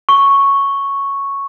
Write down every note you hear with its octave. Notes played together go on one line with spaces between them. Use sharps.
C#6